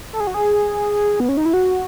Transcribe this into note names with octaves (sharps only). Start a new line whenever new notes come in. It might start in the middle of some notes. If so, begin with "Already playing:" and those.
A4
G#4
F#4
G#4
B3
C#4
D#4
E4
F#4